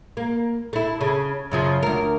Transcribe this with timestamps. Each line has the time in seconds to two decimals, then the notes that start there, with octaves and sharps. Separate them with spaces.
0.17 A#3
0.73 A3 E4
1.01 C#3
1.51 F#2 C#3 F3
1.82 D2 A#4